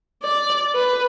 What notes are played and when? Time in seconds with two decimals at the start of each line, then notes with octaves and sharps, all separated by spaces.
0.23 D5
0.75 B4